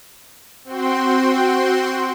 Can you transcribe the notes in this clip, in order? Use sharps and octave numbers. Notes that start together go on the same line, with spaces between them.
C4 F#4 G5 C6